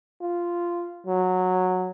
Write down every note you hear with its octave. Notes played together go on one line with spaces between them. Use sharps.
F4
F#3